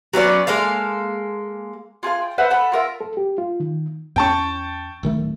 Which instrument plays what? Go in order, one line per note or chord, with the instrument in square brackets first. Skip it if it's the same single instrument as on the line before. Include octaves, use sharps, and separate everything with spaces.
[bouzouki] F#3 B3 C#4 D5
G#3 A#3 A4 F5
[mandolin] F4 G#4 A4 F5
G5
B4 C5 E5 F#5
A4 F#5 B5
F4 A#4 E5
[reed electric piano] A4
G4
F4
D#3
[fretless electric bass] E2 C#4 [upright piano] G5 A5 C#6
[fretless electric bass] D1 D#3 A3